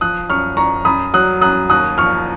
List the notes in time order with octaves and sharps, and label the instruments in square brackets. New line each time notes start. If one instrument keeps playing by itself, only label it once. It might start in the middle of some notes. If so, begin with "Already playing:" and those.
[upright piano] F3 D#6 F#6
F#2 C#6 F6
F#2 A#5 C#6
F#2 B5 D#6
F#3 D#6 F#6
F#2 D#6 F#6
D#2 D#6 F#6
F3 C#6 F6